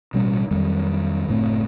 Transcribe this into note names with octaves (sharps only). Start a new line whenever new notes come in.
A1 B2 G3 C#4
F2 D#3 F#3 G3
F#1 A2 A3 C4